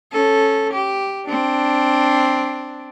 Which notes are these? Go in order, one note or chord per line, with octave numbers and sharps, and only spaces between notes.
C#4 A4
G4
C4 D4